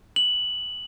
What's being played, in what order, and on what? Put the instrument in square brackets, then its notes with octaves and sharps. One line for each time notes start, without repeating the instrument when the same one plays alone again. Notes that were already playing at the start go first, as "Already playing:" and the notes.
[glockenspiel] F#7